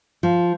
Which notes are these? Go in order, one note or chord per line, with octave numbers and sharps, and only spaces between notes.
F3